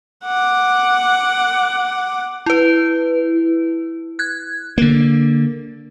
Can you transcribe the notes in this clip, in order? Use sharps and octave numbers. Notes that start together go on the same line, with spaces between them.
F#5 D6
E4 B4
F#6 G#6
D3 A#3